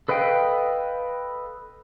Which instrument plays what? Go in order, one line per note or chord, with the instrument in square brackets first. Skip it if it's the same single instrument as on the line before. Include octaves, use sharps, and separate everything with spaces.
[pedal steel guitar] A4 B4 D#5 F5 G5